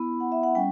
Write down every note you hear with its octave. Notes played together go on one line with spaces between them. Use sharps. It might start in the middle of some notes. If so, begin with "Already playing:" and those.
Already playing: B3 E4 B5
F#5
E5
F#5
G3 C#4 G5